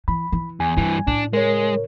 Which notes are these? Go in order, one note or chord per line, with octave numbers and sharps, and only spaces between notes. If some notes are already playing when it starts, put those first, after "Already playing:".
E3 B5
E3
E2 G#5
G2 E3 G3
A2 C#3 D4
G#3 A#4 C#5